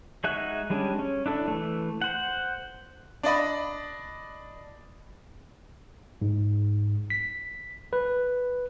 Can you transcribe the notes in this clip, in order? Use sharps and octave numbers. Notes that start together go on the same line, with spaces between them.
G#3 D#4 F#4 E5 F#6
G3 G#3 C#4 D4
C#4
D4 E4 A4
E3 A3
C5 F#5
D4 D5 D#5 B5
G#2
B6
B4